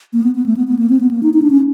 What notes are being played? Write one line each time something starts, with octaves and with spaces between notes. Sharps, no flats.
A#3
B3
B3
A3
B3
B3
A#3
C4
B3
A#3
D#4
D#4
D4
C#4